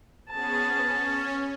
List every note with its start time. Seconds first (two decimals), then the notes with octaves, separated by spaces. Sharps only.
0.30 B3 C#4 G#4 A5
0.70 C#4